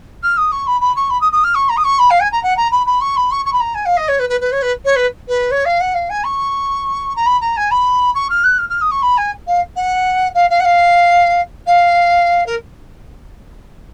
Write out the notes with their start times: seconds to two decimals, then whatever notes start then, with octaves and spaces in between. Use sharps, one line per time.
0.22 F6
0.37 D#6
0.51 C#6
0.67 B5
0.80 B5
0.95 C#6
1.10 B5
1.21 D#6
1.32 D#6
1.43 F6
1.54 C#6
1.69 A#5
1.76 D#6
1.84 C#6
1.98 B5
2.10 F5
2.20 G#5
2.32 A#5
2.43 F#5
2.56 A#5
2.71 B5
2.86 B5
3.00 C#6
3.16 B5
3.31 C#6
3.45 C#6
3.52 B5
3.60 A#5
3.74 G#5
3.85 F5
3.97 D#5
4.08 C#5
4.19 B4
4.29 B4
4.40 B4
4.52 C#5
4.62 B4
4.84 C#5
4.95 B4
5.28 B4
5.51 C#5
5.65 F5
5.80 F#5
5.94 F5
6.09 G#5
6.24 C#6
7.15 A#5
7.26 B5
7.40 A#5
7.56 G#5
7.71 B5
8.14 C#6
8.29 F6
8.44 F#6
8.58 F6
8.69 F6
8.81 D#6
8.91 C#6
9.02 B5
9.17 G#5
9.47 F5
9.76 F#5
10.34 F5
10.50 F5
10.59 F#5
10.64 F5
11.66 F5
12.46 A#4